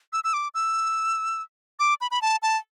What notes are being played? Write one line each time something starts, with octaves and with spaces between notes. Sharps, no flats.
E6
E6
D6
E6
D6
B5
B5
A5
A5